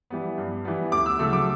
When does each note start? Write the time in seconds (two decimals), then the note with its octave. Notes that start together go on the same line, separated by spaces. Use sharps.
0.10 E3 G3 B3
0.38 G2
0.65 E3 G3 B3
0.92 D2 D6
1.06 E6
1.19 C#3 F#3 A3 E6
1.33 D6